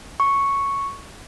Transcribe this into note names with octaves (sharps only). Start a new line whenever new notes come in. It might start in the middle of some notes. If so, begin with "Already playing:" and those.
C#6